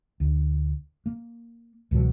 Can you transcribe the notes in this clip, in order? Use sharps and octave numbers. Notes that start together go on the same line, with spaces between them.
D2
A#3
C#2 B2 E3 F#3